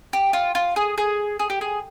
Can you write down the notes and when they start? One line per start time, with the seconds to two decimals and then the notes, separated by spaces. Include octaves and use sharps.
0.13 G4
0.33 F4
0.55 F4
0.76 G#4
0.98 G#4
1.39 G#4
1.50 G4
1.61 G#4